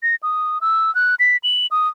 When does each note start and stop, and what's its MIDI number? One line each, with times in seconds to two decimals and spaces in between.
0.03 0.15 94
0.23 0.58 87
0.61 0.93 88
0.95 1.15 90
1.19 1.37 95
1.44 1.67 102
1.71 1.88 87